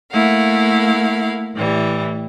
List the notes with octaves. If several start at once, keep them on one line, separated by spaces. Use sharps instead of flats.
A3 A#3 E4 F5 F#5
A2 E3 G3